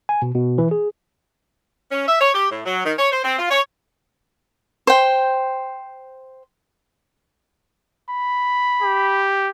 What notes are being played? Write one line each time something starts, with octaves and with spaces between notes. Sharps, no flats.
G#5
B2
B2
E3
G#4
C#4
E5
C#5
G4
A2
F#3
D#3
C#5
C5
C4
F4
C#5
C5 G5
B5
G4